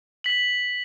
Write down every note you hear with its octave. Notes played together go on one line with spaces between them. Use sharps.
B6 F#7